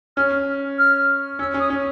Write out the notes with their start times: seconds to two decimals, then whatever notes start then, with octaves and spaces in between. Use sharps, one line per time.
0.17 C#4 F6
0.78 F6
1.39 C#4 E6
1.54 C#4
1.59 D#6
1.70 C#4